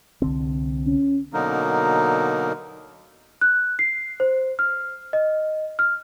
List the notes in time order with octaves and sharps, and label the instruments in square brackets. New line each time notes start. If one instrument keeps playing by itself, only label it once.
[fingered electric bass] C2 D3 C4
[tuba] C#4
[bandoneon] B2 D3 F#3 A#3 D#4 A#4
[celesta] F#6
C7
C5
F6
D#5
F6